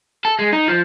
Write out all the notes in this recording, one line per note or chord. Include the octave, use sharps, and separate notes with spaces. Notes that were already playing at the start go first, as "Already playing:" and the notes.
A4
G#3
D#4
F3